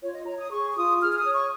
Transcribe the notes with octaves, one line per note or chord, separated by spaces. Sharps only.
F4 C#5
D#5
C#5 A#5
D#6
G#4 C#6
C#6
F4 D#6
G#4 F6
F6
D#6
C#5
C#6